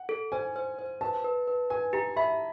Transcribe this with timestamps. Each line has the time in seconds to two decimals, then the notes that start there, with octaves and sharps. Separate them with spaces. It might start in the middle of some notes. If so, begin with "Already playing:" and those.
Already playing: F#5
0.09 A4
0.32 C5 G#5
0.56 C5
0.79 C5
1.01 B4 A5
1.24 B4
1.47 B4
1.70 B4 G#5
1.93 G4 A#5
2.16 E5 B5